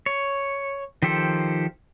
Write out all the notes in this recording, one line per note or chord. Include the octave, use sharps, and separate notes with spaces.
C#5
D#3 F3 G4 A4 C5